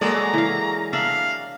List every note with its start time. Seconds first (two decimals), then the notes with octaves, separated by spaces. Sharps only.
0.01 F#3 G#3 A#3 G#4 A4 D5 A#5
0.33 E3 F5
0.93 D4 E5 F5